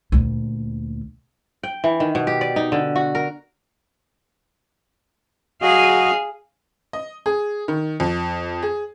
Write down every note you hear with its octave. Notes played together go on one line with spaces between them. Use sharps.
D2 A#2
G5
E3
D#3
B2
G4
D5
D#4
D3
F#4
A#4
F#3 F#4 G#4 D#5 F5
D#5
G#4
D#3
F2
G#4